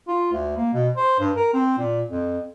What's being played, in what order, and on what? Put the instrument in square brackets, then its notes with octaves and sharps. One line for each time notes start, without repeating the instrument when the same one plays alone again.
[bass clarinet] F4
D2
A#3
B2
C5
G2
A#4
C4
A#2
F2